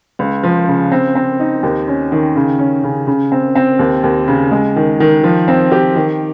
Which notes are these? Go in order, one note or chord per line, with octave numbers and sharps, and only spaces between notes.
C#2
F3
C#3
C4
C4
D#4
D#2
C#4
D#3
C#3
C#4
C#3
C#3
C4
C4
D#2
D#2
C#3
G#3
D#3
D#3
F3
C4
G4
D#3